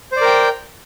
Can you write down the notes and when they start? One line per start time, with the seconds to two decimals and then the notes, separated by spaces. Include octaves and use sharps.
0.12 C5
0.16 D5
0.21 A#4
0.26 G5